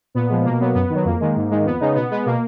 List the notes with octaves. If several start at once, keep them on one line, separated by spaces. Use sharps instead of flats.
A#2 B3
F3 G#3
B2 A#3
F#3 B3
F#2 B3
D#3
F#3
F2 A#3
D#3 G#3
G#2
D#3 G#3
F2 B3
C#3 G#3 D#4
B2 B3
G#3 B3
B2 A#3